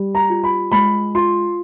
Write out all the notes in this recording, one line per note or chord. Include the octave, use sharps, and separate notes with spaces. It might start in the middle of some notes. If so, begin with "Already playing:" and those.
Already playing: G3
A#5
F4
B5
G#3 B5
F4 C6